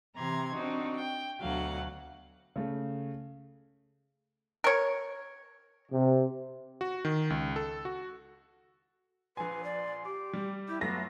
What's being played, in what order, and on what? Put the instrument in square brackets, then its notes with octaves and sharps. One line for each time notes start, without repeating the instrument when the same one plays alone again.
[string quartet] C3 E3 G4 A#5 C6 G#6
C4 D4 D#4 F#4
G5
D2 B2 D3 F#3 F5 F#5
[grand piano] C#3 A3
[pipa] A#4 C#5
[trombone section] C3
[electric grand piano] F#4
D#3
C#2
A4
F#4
[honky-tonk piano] A#1 G#5 [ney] B4 [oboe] C6
[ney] D5
[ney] G4 [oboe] D6
[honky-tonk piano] G3
[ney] E4 [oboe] G4
[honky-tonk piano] F#2 A3 A#6 [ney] B3 [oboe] F4